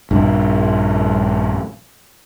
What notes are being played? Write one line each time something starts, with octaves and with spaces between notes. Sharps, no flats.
A#1 G2 D4